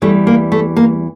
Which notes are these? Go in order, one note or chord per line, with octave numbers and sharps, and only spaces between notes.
E2 E3 G3 A3
A#3
A3
A#3